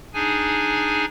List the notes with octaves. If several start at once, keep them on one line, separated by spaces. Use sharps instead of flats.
D4 D#4 G#4 G#5